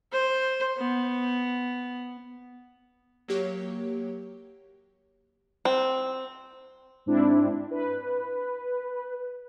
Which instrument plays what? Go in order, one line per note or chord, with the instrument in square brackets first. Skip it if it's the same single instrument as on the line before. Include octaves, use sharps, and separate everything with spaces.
[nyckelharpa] C5
B3
[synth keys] F#3 A#3 G4 C#5
[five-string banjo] C4
[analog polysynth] G#2 C4 D4 E4
B4